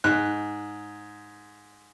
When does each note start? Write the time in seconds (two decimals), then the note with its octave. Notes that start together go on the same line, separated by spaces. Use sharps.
0.04 G#2 F#6